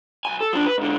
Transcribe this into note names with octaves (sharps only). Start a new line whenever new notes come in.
B1 G#5
A4
F3 D4
B4
G#2 D3